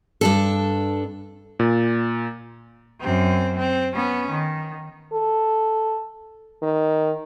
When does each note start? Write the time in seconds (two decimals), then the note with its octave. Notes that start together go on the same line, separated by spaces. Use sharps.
0.21 G2 D4 A4
1.59 A#2
3.01 F#2 C4
3.58 C4
3.95 B3 C#4
4.31 D#3
5.13 A4
6.63 D#3